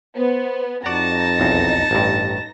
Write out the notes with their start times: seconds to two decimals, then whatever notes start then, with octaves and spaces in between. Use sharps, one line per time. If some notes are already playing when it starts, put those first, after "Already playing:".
0.16 B3 C5
0.86 F2 D#4 F#4 D5 A5 A#6
1.40 B1 E2
1.91 A1 G2